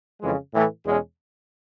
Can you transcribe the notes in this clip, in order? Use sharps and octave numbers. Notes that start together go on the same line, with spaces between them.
F2 C#3 E3 G#3
A2 E3 A3
E2 B2 G#3 C#4